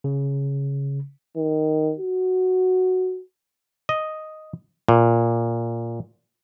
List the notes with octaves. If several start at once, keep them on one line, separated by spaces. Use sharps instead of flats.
C#3
D#3
F#4
D#5
A#2